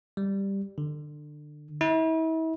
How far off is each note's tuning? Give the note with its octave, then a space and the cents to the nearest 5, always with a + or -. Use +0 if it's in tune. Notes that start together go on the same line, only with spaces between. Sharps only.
G3 +5
D3 +25
E4 -40